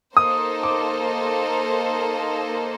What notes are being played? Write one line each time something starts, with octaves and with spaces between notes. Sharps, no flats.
A#3 D#4 A4 C5 D#6
D6